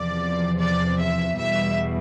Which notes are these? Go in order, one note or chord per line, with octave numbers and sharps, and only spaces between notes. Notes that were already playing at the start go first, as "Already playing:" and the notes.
Already playing: E2 C3 F3 D5
D5
E5
E2 B2 G3 E5